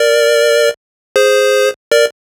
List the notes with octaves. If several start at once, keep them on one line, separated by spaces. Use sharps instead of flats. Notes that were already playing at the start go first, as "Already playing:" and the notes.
Already playing: A#4 D5
G#4 C5
A#4 D5